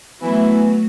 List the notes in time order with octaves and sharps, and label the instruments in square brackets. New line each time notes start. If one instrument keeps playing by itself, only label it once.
[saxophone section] E3 E4 [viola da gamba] F#3 A3 [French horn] B3